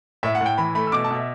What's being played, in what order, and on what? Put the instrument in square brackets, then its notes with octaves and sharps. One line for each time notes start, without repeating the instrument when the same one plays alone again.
[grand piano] A2 E5
F#5
A2 G5
E3 B5
A3 B5
E6
B2 D6
A5
B2
E5